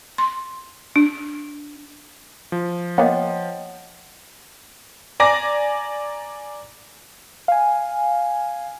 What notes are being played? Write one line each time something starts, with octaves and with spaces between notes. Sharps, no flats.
C6
D4
F3
A#3 B3 C#5 D#5 F#5 G5
D5 G#5 A#5 D6 A#6
F5 G#5